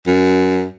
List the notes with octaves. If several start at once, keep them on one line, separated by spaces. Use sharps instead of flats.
F#2